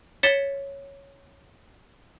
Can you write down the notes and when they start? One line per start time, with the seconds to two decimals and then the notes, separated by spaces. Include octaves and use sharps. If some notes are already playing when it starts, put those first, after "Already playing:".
0.23 C#5 A6 B6 C#7 E7 G7